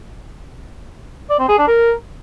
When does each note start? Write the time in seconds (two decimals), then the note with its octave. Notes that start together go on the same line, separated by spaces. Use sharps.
1.30 D5
1.39 C4
1.49 G#4
1.58 D4
1.68 A#4